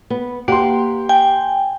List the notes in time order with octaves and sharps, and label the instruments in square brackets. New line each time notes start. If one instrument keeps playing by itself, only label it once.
[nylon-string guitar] B3
[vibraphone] A#3 [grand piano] G4 C6 [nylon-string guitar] F5 F#5
[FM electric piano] G5 [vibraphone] G#5